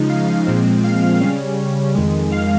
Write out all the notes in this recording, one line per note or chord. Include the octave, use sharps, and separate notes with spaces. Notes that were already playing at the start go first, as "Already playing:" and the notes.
Already playing: C#3 F3 G#3 D#4
F5
A#2 F3 G#3 C4
F5
C#3 G3 C#4
F2 D#3 G#3
F5